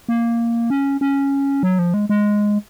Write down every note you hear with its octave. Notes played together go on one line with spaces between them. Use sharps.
A#3
C#4
C#4
F#3
F3
G#3
G#3